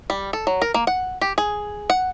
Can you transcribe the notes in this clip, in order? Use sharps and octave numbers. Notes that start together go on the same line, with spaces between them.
G3
A4
F#3
A#4
A#3
F#5
G4
G#4
F#5